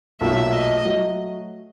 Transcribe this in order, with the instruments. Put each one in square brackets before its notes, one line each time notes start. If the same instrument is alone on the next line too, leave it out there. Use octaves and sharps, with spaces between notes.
[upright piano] B1 A#2 F#3 A3 [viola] E5
[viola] D#5
[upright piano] F#3 A3